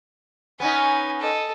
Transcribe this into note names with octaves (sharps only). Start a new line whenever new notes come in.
B3 C#4 D#4 G#5
A4 D#5